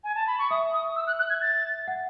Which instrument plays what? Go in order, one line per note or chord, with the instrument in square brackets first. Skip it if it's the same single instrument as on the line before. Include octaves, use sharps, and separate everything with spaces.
[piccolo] G#5
A5
B5
C#6
[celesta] E5 [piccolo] D#6
[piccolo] D#6
E6
F#6
F#6
G#6
A6
[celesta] F#5